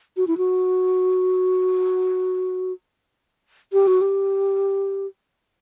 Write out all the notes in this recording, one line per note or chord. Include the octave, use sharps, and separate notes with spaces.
F#4
E4
F#4
G4
F#4
G4